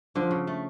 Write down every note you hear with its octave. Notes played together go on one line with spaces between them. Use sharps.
D3 F3
C#3
A3